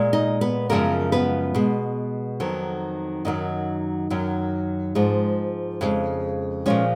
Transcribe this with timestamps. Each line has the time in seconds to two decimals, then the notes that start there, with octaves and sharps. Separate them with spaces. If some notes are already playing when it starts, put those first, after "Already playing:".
Already playing: A#2 G#3
0.13 D#4 D#5
0.41 B3 B4
0.70 F#2 C#3 F3 G#3 A#3 A#4
1.12 B3 B4
1.55 B2 G#3
2.40 F2 D#3 F#3
3.25 F#2 D#3 F#3 D#4 D#5
4.10 F#2 D#3 F#3
4.95 G#2 F3 G#3
5.81 F2 C#3 G#3
6.66 A#2 F3 G#3 C#4 C#5